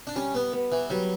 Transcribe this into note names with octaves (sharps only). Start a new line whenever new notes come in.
D4
G3 C#4
B3
B3
E3
F#3 G3